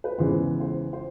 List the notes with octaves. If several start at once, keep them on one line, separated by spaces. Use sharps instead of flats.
B4
E2 C#3 E3 G#3 C5
C5
C5